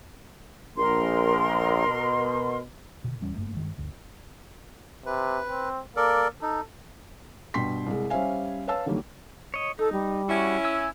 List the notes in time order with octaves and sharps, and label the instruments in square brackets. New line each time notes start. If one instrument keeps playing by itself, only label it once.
[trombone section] A#1 [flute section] A#4 C6
[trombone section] B2
[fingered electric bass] B2 D3
D1 E2 G3 C#4
F#1 G2 A3 A#3
G2 D#3 G#3
G1 D2
[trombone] C3 [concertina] B4
[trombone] C4
[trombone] A#3 [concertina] A4 A#4 D5
[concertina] D#4 [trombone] A4
[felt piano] G2 B2 G5 C6 B6
C2 G#3
G3 C#4 C5 E5 F5 G#5
B4 C#5 F5 A5 E6
D3 D#3 F#3 G3 A#3
[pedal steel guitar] C#5 D#5
[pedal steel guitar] D#4 [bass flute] A4
[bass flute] G3
[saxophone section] C#4 E4 [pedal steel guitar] F#4
[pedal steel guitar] G#5 E6